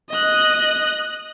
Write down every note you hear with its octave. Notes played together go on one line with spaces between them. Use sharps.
D#5 F#6